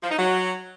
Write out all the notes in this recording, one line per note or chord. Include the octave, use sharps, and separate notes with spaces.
F3
D#4
F#3